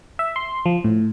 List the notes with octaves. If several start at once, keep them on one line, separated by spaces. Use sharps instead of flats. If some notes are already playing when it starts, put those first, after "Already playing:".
E5
C6
F3
A2